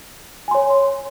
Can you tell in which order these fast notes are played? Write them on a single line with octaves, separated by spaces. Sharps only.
G#5 C6 C#5